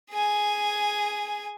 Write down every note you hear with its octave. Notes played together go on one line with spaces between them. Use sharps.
G#4 G#5